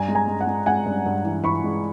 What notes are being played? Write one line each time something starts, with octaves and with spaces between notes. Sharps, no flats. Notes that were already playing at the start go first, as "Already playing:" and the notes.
Already playing: G2 G#5 A#5
G#3
G#5 A#5
G#3
F#5
G#3
G#3 F#5 G#5
G2
G2
E3
E3 B5 C#6
G#3